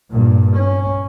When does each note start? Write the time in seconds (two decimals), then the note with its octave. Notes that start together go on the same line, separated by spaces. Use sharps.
0.11 G2 A#2
0.57 C#4